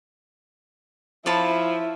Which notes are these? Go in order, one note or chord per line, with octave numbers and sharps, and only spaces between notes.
F3 E4 C#5 A5 B5